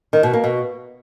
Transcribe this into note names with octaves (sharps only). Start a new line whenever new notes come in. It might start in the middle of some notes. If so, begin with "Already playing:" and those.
D#3
B2
A#3
B2